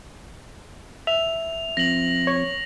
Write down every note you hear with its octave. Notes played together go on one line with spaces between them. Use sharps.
E5 F7
F3 C4 A#6 F#7
C#5